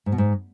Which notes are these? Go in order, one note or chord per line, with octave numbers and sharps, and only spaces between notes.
G#2
B2
G#2